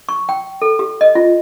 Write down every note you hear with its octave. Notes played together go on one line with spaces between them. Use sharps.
C#6
G5
A4
G4
D#5
F4